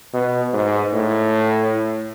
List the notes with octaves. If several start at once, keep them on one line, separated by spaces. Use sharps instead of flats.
B2
G#2
A2